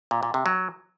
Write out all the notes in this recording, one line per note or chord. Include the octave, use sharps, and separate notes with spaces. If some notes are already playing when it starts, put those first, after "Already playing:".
A#2
A#2
C3
F#3